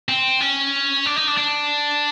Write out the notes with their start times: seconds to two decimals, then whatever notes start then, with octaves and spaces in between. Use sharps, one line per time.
0.09 C4
0.41 C#4
1.06 D4
1.16 D#4
1.27 D4
1.38 D4